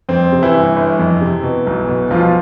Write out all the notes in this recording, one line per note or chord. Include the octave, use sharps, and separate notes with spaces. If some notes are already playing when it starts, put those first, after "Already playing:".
F2 C4
C3
E3 E4
G1
G1
F2
C3
B2
B1
B2
B1 F3 F4